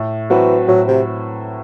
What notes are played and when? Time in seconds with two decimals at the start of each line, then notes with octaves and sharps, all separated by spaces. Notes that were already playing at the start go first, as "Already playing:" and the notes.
Already playing: A2
0.30 E3 F#3 C4 F#4 B4
0.68 A2 F#3
0.88 C3